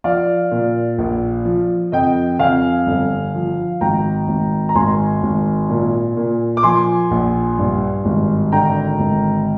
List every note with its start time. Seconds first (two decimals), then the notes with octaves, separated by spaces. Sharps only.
0.04 F3 D5 F5
0.51 A#2
0.98 A#1
1.45 F3
1.92 F2 D#5 G5
2.39 F2 F5 G#5
2.87 G1
3.34 F3
3.81 G#1 G5 A#5
4.28 G#1
4.69 A#5
4.75 G#1 G#5 C6
5.23 G#1
5.69 A#2
6.17 A#2
6.57 D6
6.63 F3 G#5 C6
7.11 A#1
7.59 G2
8.05 G#1
8.52 D3 G5 A#5
9.00 G#1